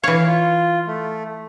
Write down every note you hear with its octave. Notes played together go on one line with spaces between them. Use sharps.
E3 C#5 F5
F4
A3